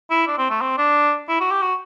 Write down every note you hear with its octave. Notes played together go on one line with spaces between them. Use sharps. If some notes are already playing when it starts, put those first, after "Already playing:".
E4
D4
C4
A3
C4
D4
E4
F#4
G4
F#4